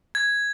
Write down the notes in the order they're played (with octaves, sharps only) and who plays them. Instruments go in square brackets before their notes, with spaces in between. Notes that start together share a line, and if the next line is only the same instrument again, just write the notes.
[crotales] G#6